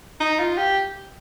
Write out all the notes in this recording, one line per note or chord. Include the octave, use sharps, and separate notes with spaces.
D#4
F4
G4